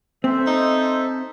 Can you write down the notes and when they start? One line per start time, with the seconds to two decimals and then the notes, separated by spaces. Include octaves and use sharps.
0.24 C4 A4 C5 E5
0.47 D#4